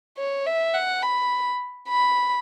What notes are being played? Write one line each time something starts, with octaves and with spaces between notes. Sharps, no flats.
C#5
E5
F#5
B5
B5